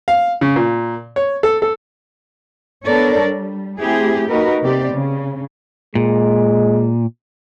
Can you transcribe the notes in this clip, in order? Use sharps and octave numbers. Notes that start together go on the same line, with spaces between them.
F5
C#3
A#2
C#5
A4
A4
B3 D4 A4 A#4 C#5 D5
G3
A3 C4 E4 G4 G#4
A#3 D#4 F#4 A#4 B4
C3 B3 C4 G4 D5
C#3
A#2 G#3